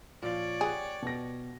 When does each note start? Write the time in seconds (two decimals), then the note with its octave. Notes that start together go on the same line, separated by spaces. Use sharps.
0.23 A#2 F3 C#5 D5
0.61 G4 G#4 B4 F#5
1.02 B2 A#6